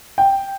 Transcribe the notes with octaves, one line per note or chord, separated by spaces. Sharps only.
G5